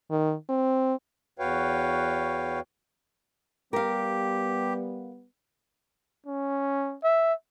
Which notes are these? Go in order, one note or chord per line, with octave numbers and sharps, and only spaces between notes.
D#3
C4
E2 F#4 B4 C#5 F5 G5
G3 B3 G4 A#4 F5
C#4
E5